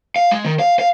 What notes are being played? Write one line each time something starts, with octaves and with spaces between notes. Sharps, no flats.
F5
G#3
D#3
F5
F5